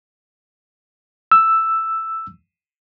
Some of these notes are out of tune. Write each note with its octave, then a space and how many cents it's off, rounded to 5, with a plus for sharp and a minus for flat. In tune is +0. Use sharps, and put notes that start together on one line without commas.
E6 +5